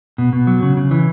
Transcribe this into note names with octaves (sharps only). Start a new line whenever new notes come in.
B2
B2
F#3
C#3
C#3
E3